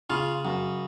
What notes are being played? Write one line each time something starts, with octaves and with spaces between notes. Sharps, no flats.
C#3 F4
F#2